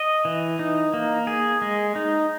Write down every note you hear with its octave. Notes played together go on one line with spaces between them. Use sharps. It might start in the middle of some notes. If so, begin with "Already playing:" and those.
Already playing: D#5
E3
D#4
A#3
G#4
G#3
D#4